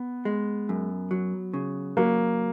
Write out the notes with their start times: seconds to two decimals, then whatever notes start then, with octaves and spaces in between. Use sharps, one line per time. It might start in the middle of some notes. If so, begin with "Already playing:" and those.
Already playing: B3
0.25 G#3
0.69 F#2
1.11 F#3
1.54 C#3
1.97 F#3 A#3